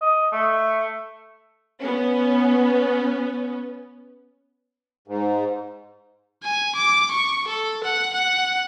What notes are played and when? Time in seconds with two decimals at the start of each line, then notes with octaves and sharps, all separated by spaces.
0.02 D#5
0.32 A3
1.80 B3 C#4
5.08 G#2
6.44 G#5
6.75 D6
7.11 C#6
7.47 A4
7.84 F#5
8.14 F#5